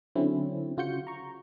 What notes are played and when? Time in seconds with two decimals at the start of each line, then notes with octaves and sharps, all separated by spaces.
0.15 D3 F#3 C4 C#4 E4
0.77 C#3 F4 F#4 G6 C#7
1.07 A#5 C#6